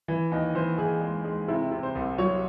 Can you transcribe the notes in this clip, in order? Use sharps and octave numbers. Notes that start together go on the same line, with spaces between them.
E3
D#2 D#5
E3 C5
E3 G#4
G#3
G#3
C3 E4
C3
C5
C2
F#3 C#5